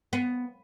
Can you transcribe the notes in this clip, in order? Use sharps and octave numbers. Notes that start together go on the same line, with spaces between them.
B3